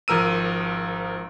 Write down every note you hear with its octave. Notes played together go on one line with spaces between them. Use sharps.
G#1 F3 A#4 E6 D#7